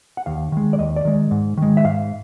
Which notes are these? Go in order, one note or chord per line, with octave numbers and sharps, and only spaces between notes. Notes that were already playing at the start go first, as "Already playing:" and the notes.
F#5
D#2 F5
D#3 G#3
D5
D#2 D#5
D5
D#3 G#3
G#2
D#3 G#3
E5
G#2 F5